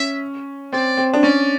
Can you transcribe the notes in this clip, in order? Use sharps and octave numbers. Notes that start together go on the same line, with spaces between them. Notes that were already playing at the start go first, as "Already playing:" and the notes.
Already playing: C#4 E5
C4 D5
C4
D4
C#4 D5